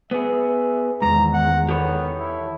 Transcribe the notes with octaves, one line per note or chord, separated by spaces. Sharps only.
B3 G#4 E5
E2 G#2 D#3 A#5
F#5
B3 G4 A4 C#5
E4